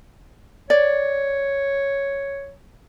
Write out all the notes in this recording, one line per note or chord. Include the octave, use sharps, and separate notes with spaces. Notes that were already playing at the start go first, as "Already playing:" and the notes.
C#5 D5